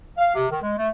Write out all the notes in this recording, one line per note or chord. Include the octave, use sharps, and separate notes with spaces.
F5
C3
D#3
G#3
A3